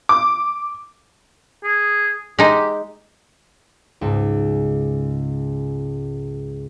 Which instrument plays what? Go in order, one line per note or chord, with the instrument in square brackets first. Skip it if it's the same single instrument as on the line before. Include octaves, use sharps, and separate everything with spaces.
[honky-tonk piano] D6
[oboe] G#4
[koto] G#3 D#4 [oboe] G4
[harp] C#2 G#2